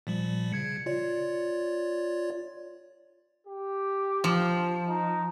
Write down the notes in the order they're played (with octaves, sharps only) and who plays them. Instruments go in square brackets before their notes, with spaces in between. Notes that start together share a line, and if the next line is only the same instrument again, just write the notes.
[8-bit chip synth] A#2 F3 G3
C#3 G#6 C#7
F4 C#5 D5
[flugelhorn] G4
[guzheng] F3
[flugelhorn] D#4